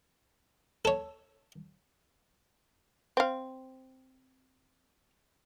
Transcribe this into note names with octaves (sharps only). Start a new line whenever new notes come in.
A4 C#5
C4 F5